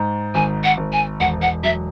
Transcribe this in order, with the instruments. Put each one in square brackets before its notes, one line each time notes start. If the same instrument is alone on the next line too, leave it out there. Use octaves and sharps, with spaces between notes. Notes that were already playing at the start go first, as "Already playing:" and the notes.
Already playing: [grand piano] G#2
[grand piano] G#1 [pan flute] G#5
[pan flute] F#5
[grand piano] G#1
[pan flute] G#5
[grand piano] E1 [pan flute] F#5
[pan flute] F#5
[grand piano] F#3 [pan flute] E5